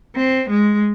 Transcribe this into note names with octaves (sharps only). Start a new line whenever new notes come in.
C4
G#3